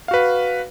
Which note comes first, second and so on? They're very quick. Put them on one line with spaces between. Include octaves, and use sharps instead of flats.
F5 F#4 B4